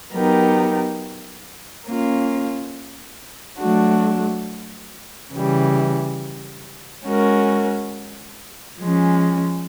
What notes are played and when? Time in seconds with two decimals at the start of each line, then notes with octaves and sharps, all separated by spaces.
0.13 F#3 B3 D#4 G4 A#4
1.86 A#3 C#4 F4
3.60 F#3 A3 D4 F#4
5.33 C#3 E3 G3
7.05 G#3 C#4 F#4 A#4
8.79 F3 G#3 C#4